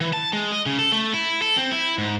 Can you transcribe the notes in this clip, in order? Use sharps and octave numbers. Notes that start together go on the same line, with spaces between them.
E3
A5
G#3
D#5
C#3
A4
A3
E4
A4
C4
E4
G#2